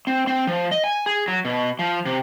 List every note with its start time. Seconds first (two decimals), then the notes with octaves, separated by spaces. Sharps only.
0.07 C4
0.27 C4
0.47 F3
0.71 D#5
0.84 G#5
1.06 G#4
1.28 F#3
1.45 B2
1.79 F3
2.06 C3